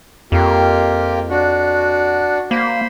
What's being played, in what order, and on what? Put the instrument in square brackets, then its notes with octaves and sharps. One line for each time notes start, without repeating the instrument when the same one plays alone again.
[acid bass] F2 [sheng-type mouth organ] A#3 F4 G4
[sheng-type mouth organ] D4 F#4
[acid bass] A#3 [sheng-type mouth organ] C5 B5